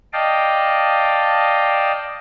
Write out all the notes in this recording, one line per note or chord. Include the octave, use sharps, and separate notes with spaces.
D5 D#5 F5 G5 A5